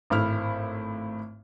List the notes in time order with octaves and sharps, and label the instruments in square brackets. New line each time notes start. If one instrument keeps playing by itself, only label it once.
[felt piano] G#1 A2 E4 F6